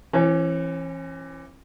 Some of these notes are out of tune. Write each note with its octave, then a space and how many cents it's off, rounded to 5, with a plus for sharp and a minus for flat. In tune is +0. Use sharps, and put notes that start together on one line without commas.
E3 +20 C#4 -40